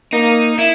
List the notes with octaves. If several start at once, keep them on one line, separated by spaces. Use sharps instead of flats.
A#3 D#4
E4